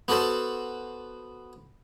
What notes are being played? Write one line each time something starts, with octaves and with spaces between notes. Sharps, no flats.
B3 F#4 A4 C5 A5